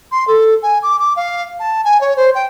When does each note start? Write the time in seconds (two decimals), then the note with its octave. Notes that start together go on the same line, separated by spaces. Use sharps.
0.12 C6
0.28 A4
0.62 G#5
0.83 D6
0.99 D6
1.16 F5
1.60 A5
1.84 G#5
2.01 C#5
2.16 C5
2.35 G5